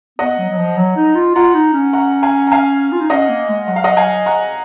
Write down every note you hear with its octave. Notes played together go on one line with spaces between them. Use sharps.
B3 D#5 F#5
F#3
F#3
F3
F#3
D#4
F4
F4 F#5 A#5
D#4
C#4
F#5 A#5
F5 G#5
A#5
F5 G#5
F4
D#4
C#4 D#5 F#5
A#3
G#3
F#3 F#5
F5
D#5 F#5
F#3 F5 G#5
F#5 A#5